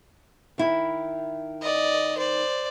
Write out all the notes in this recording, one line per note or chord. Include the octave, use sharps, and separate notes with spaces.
D#3 E4
D5 D#5
C5 D5